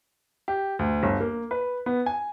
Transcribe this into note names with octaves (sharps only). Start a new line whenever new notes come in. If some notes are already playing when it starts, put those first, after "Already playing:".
G4
D2
G1
A#3
B4
B3
G#5